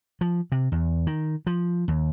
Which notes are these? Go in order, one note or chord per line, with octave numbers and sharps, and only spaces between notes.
F3
C3
E2
D#3
F3
D#2